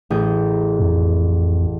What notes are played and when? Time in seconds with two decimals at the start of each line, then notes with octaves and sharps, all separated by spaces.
0.10 A1 G#4 G6
0.79 F2